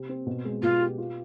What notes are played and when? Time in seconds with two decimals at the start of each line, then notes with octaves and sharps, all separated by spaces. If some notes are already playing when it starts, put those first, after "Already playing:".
Already playing: C3
0.09 C4
0.26 B2
0.45 G#3
0.62 B2 F4
0.80 G4
0.98 F4